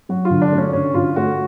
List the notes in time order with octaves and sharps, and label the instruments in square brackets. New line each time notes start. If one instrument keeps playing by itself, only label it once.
[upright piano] F#3 [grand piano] F#4
[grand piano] F4
[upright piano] D3
[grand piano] D4
[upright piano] A3
[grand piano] C#4
[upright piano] D3 [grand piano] C#4
[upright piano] D3 [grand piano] F4
[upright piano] A3 [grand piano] F#4